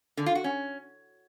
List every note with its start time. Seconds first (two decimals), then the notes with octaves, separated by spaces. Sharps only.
0.17 D3
0.26 F4
0.35 F#4
0.44 C#4